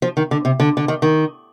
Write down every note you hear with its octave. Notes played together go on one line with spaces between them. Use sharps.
F3
D#3
D3
C3
D3
D3
D#3
D#3